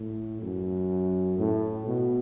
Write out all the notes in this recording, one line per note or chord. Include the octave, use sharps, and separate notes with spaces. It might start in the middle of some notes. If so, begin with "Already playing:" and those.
Already playing: A2
F#2
A2
B2